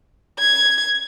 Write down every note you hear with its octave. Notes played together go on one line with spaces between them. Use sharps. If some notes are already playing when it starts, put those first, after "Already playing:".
G#6